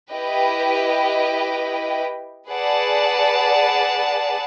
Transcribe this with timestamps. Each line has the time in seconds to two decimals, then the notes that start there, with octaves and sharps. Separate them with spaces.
0.11 E4 G4 B4 D#5 G5
2.50 G#4 B4 D5 F#5 A5